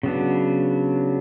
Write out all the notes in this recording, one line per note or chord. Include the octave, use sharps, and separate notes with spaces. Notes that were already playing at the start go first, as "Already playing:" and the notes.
C#3 F#3 B3 D4